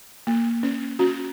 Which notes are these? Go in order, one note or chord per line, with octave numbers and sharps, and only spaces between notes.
A#3
C#4
C#4 F#4